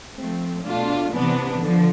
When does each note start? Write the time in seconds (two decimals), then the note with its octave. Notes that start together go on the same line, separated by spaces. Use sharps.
0.18 F3 A3 C4
0.66 B2 A3 D4 F4
1.13 C3 E3 B3 D4
1.61 D3 F3